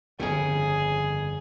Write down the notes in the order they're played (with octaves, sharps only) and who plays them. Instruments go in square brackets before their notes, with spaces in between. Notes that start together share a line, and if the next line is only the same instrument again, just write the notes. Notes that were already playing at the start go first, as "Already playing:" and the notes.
[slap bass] G1 F2 C#3 [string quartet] G#4